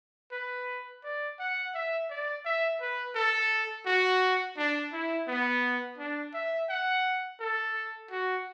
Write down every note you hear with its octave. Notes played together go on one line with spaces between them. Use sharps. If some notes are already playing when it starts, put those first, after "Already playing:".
B4
D5
F#5
E5
D5
E5
B4
A4
F#4
D4
E4
B3
D4
E5
F#5
A4
F#4